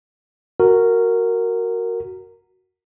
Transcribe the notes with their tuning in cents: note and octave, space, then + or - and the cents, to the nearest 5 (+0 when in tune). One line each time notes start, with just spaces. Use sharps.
F#4 +0 A#4 -10